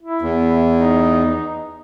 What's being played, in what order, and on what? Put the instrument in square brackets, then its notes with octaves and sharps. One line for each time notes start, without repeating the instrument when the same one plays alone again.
[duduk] E4
[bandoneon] E2
[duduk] D#4